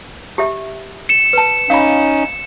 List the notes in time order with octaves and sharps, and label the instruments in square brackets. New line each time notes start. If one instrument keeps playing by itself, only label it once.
[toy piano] G4 E5
[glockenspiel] C#7 E7
[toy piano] B4 A5
[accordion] C#4 D#4 [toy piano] F5 B5